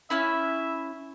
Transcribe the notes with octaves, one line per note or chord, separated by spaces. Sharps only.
C#4 E4 E5 B5